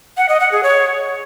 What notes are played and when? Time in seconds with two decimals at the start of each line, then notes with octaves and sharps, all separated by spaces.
0.17 F#5
0.29 D#5
0.40 F#5
0.52 G#4
0.63 C#5